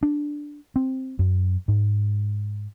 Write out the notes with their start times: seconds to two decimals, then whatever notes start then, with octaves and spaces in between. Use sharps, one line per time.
0.03 D4
0.76 C4
1.19 F#2
1.68 G#2